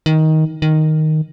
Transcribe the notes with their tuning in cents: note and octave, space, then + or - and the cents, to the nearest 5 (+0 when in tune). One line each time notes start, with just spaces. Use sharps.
D#3 +15
D#3 +0